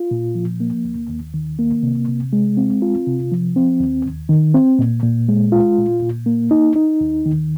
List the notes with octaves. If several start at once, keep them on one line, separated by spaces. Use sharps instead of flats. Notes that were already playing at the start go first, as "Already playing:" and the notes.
Already playing: F4
A#2
F3
A#3
D#2
D#2
D#3
A#3
C3
C3
G#3
C4
F4
C3
F3
C4
D#2
D#2
D#3
C4
A#2
A#2
G#3
F4
A#2
A#2
A#3
D#4
D#4
D#2
D#3